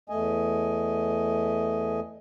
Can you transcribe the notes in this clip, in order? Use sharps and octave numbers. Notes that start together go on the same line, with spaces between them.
E2 A3 D#5 G#5